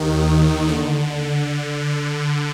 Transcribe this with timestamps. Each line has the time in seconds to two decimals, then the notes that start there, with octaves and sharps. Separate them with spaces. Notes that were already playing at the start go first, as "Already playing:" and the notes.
Already playing: D#2 D#3
0.68 D3